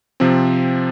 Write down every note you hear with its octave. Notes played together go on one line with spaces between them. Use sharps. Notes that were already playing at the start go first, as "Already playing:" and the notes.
C3 F3 C4